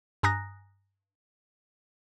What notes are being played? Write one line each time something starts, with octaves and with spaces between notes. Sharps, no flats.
G2 G#5 A#5 D#6 F#6 A#6